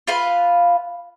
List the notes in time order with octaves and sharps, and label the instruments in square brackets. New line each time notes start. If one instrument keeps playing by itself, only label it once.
[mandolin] F4 B4 F5